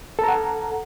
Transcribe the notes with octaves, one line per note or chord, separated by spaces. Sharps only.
A4 F#5 A#5